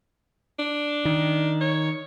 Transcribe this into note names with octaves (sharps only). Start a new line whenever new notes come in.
D4
D#3
C#5